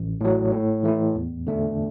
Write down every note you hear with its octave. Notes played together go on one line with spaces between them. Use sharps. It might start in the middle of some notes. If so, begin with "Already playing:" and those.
Already playing: A1
A2 F#3
A2
E3 A3 E4
E2
D3 A3 D4